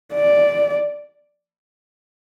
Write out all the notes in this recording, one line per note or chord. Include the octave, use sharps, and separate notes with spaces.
D5